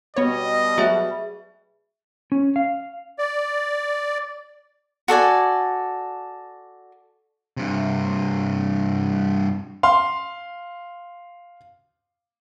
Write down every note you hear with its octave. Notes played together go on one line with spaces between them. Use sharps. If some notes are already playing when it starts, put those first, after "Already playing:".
B2 G3 B3 C#5 D#5
F#3 A3 F#4 G#4 E5
C#4
F5
D5
F#4 A4 D5 G#5
G2 C3
F5 C6